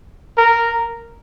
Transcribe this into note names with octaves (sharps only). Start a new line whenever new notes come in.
A#4